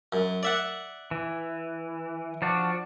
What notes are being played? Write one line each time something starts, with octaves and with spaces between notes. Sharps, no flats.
F#2
D5 E5 F#5
E3
F3 D4 F#4